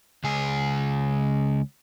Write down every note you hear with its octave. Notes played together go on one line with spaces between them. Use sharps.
C#2 G#4